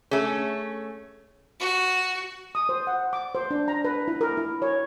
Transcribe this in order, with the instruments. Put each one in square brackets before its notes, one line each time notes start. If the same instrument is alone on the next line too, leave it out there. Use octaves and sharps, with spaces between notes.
[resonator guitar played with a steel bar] A3 C#4 [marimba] G#4
[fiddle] F#4
[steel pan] D#6
C5
F#5
D6
C5
D4
A#5
B4
E4
A#4
E4
C#5